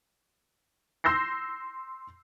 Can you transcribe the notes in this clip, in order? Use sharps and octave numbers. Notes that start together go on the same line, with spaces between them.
C6 E6 G6 A#6 C7